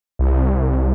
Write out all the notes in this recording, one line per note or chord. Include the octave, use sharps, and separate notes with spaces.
C2